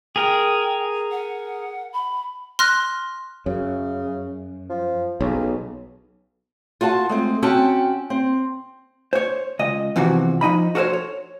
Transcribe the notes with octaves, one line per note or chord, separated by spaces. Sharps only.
G#4 A#4 G5
F#5
B5
C6 F6 F#6 A#6
F#2 C#3
F3
B1 C#3
F4 F#4 F#5 A5
G#3 A3 C4
C4 C#4 F#4 G5 A5
C4
C5 C#5
C#2 D#5
E2 C3 E3 F3 F#4
F3 D#4 D#5 B5
F#4 A4 A#4 C5 C#5
C#5